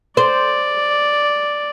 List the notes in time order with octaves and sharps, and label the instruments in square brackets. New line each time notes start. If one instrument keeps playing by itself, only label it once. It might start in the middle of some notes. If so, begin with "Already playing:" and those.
[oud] C5 [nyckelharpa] D5